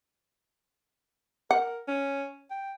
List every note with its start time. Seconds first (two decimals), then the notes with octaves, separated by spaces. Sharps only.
1.51 A#4 F#5
1.88 C#4
2.51 G5